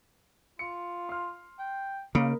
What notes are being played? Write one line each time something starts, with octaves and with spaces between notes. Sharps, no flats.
F4 C#7
C6 F6
G5
C#3 A#3 D#4 A#4 B5